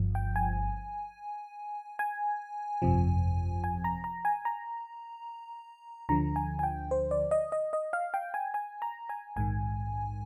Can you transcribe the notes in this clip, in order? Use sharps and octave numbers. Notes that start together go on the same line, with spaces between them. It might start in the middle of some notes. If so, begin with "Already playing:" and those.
Already playing: G1 G2 F3
G5
G#5
G#5
G1 F2 C3 F3
G#5
A#5
A#5
G#5
A#5
D2 D3 F3 A#5
G#5
G#5
G5
C5
D5
D#5
D#5
D#5
F5
G5
G#5
G#5
A#5
G#5
A#1 G#2 D#3 G#5